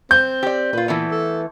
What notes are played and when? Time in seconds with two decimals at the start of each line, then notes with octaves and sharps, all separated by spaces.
0.11 C4 G6
0.43 G4 D5
0.73 A#2 F4 B4
0.88 E3 A3 B3
1.11 A4